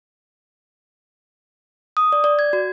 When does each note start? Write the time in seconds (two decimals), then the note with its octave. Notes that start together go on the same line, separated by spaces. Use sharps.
1.97 D#6
2.12 D5
2.24 D5
2.39 G#6
2.53 F#4